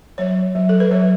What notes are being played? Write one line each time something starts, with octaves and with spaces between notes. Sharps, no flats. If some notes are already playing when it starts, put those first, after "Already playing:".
F#3 C#5
F#3
A4
B4
F#3 C#5